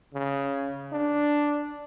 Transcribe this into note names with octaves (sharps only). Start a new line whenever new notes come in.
C#3
D4